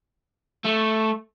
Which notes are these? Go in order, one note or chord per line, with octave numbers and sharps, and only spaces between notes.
A3